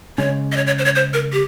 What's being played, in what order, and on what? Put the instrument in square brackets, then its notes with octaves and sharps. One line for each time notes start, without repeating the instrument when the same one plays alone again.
[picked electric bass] C#3 G#3 C#4 [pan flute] C#5
[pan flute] D#5
C#5
C#5
C5
C#5
C5
A#4
G4